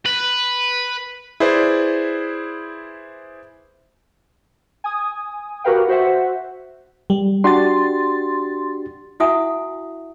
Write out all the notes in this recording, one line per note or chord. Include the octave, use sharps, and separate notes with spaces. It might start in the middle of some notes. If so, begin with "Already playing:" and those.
B4
E4 G#4 B4 C5 D5
G#5 D#6
F#4 G4 A#4 B4 F5 G5
F#4 C5 E5 F#5
G3
D4 F#4 G4 C6 A6
E4 F#4 E5 F#5 G#5 D#6